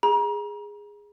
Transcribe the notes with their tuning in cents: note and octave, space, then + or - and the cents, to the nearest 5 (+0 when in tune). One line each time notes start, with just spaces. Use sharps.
G#4 -10 A#5 +35